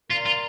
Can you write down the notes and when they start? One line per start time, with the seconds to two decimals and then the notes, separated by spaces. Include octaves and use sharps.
0.09 F4 A#4 D5 A#5
0.26 F4